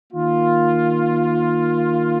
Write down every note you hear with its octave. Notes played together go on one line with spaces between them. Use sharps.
D#3 A#3 F4